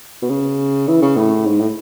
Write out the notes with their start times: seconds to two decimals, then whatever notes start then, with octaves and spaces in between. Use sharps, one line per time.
0.22 B2
0.29 C#3
0.88 E3
1.02 C#3
1.16 A2
1.46 G#2
1.60 A2